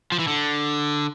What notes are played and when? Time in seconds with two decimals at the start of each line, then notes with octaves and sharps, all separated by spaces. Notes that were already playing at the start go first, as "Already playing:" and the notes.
0.12 F3
0.19 E3
0.28 D3